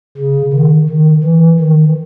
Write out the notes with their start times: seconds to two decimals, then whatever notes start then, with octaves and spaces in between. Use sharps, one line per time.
0.17 C#3
0.53 D#3
0.89 D#3
1.24 E3
1.60 D#3